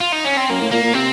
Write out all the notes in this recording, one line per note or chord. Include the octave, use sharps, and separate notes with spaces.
F4
D#4
C#4
C4
F#2 A#3
A2
A#2 A#3
A#2
C3 C4